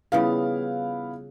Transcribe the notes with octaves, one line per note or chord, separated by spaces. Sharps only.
C#3 F3 G3 B3 E4 F5